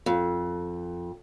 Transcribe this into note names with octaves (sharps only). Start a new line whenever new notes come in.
F2